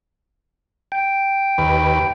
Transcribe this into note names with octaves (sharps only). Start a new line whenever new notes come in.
G5
D#2 B4